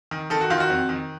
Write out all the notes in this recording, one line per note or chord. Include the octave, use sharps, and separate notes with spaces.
D#3
D#3 A4
F#4
D#3 F4
F#4
F2
D#3